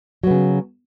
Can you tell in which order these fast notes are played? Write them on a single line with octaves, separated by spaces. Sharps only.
F#3 B3 C#3